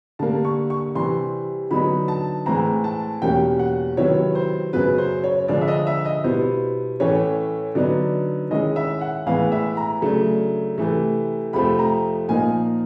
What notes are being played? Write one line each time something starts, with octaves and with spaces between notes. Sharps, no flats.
D3 G3 A#3 A5
C#6
C#6
C3 E3 G3 C4 C6
D3 F#3 B3 D#4 B5
A5
A2 E3 G#3 C4 A#5
A5
E2 B2 G3 A#3 C#4 G5
F#5
C3 D#3 F#3 B3 E4 C#5
C5
F#2 C#3 F#3 B3 B4
C5
C#5
D3 F3 G#3 D5
E5
D#5
E5
D#5
B2 G3 B3 E4 C5
A2 E3 A3 C#4 C#5
D3 F#3 B3 D#4 D5
D#3 G#3 C#4 E4 D#5
E5
F#5
A2 E3 G#3 B3 F5
E5
A#5
C#3 F#3 A3 D4
C3 E3 A3
F2 C3 F3 A3 C4 B5
A#5
A#2 F3 A#3 D#4 G#5